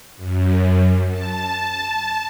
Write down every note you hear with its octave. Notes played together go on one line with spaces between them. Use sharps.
F#2
A5